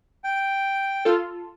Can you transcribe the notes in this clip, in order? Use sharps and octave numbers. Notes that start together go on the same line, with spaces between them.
G5
F4 A4